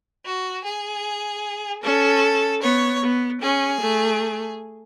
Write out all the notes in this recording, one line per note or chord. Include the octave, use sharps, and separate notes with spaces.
F#4
G#4
C#4 A4
B3 C#5
B3
C#4 G#4
A3